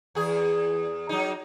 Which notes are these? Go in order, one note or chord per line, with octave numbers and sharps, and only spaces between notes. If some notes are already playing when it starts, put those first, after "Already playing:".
E2 G#4
F#3 D#4